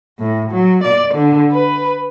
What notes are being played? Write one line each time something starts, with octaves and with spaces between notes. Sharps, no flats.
A2
F#3
D5
D3
B4